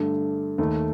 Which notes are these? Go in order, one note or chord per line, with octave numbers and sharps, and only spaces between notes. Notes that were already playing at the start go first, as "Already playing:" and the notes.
Already playing: G2 D3 A3
D#2 D#3 A3